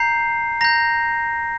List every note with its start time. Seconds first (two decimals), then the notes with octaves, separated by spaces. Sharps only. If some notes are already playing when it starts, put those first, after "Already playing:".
Already playing: A#5 G6 C7
0.61 A#5 G6 A#6